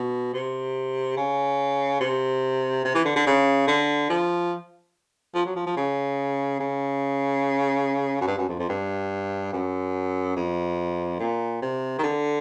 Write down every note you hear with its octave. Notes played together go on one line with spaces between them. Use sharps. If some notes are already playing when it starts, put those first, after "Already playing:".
Already playing: B2
C3
C#3
C3
C3
E3
D3
D3
C#3
D3
F3
F3
F#3
F3
F3
C#3
C#3
F#2
G2
F#2
F2
F2
G2
F#2
F2
A#2
C3
D#3
D3